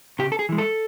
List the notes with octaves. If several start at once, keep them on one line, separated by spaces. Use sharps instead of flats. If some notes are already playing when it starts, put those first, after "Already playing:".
C#3 G4
A4
G#4
E3 G#3
A4